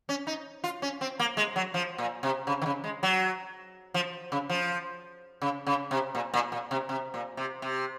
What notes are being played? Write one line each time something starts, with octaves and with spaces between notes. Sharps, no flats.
C#4
D#4
F4
C#4
C4
A#3
G#3
F#3
F3
A#2
C3
C#3
D#3
C#3
G#3
F#3
F3
C#3
F3
C#3
C#3
C3
A#2
A#2
A#2
C3
C3
A#2
C3
C3